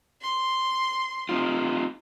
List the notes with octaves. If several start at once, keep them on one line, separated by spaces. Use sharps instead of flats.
C6
C4 D#4 F4